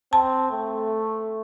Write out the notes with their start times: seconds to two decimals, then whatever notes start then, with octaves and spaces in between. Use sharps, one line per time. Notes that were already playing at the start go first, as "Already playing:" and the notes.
0.13 C4 A5
0.51 A3